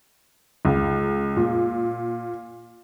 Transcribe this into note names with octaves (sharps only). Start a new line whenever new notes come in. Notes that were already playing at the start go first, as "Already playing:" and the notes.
C#2
A#2